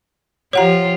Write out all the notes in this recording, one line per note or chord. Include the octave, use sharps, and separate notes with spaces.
F3 F4 G4 C#5 F#5 A#5